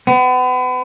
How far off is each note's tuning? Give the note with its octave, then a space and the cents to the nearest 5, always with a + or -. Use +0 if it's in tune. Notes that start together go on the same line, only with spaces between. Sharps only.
B3 +35